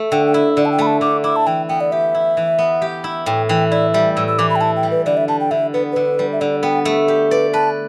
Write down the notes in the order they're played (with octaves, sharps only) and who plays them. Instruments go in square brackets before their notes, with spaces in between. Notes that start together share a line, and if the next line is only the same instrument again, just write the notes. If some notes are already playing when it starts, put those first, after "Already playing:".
Already playing: [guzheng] A3
[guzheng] D3 [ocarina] G5
[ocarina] G5
[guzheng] E4 [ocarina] E5
[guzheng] D3 [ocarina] D5
[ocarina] A5
G5
[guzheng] A3 [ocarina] B5
[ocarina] A5
[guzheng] D3 [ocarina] D6
[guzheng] E4 [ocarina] D6
[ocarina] A5
[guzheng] E3 [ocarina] G5
[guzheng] B3 [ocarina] G5
[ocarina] D5
[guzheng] G4 [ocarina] E5
[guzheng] E4
E3
B3
G4
E4
[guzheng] A2 [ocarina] G5
[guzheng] E3 [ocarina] G5
[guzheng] E4 [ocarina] D5
[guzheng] G3 [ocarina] E5
[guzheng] A2 [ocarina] E6
[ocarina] E6
[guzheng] E3 [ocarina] D6
[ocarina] B5
G5
[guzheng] E4 [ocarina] A5
[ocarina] G5
[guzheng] G3
[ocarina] B4
[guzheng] D3 [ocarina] D5
[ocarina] E5
[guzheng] G3 [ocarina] A5
[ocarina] G5
[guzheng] D3 [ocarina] E5
[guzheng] B3 [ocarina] B4
[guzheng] D3 [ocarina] B4
[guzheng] G3
[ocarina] E5
[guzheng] D3 [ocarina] D5
[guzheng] B3 [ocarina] G5
[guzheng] A3
G4
[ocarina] B4 [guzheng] D5
[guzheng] B4 [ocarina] A5